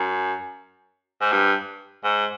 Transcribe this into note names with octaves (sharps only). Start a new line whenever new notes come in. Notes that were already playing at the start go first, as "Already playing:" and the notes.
Already playing: F#2
G#2
G2
G#2